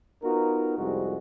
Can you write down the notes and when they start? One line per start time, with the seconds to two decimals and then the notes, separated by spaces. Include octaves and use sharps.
0.23 B3 D#4 F4 F#4 A#4
0.78 C2 F2 G3 G#3 C4 F#4